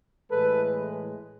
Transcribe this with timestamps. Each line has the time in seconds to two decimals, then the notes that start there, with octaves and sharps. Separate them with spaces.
0.31 A2 E3 G#3 A4 B4